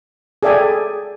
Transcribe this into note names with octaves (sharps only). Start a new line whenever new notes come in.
G#4 A4 D5 E5 G5 G#5